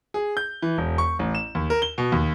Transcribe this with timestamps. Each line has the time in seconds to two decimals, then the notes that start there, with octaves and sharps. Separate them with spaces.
0.14 G#4
0.37 G6
0.62 E3
0.78 E1
0.98 C#6
1.19 A1
1.35 E7
1.55 D#2
1.70 A#4
1.82 G7
1.98 B2
2.12 D#2